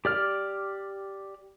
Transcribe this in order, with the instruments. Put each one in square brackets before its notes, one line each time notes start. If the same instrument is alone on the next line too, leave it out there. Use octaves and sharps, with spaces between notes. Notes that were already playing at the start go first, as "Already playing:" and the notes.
[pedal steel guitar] G4 D5 F6